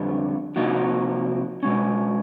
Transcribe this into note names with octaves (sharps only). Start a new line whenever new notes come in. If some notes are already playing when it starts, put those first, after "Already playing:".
Already playing: F2 D3 G3 B3
C3 F3 A#3 D#4 F#4
B2 G#3 C#4